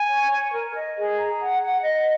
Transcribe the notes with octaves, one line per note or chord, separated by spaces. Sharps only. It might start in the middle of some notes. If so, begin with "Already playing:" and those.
Already playing: G#5
C#5
C#5
A#4
D#5
G#4
A#5
F#5
F#5
D#5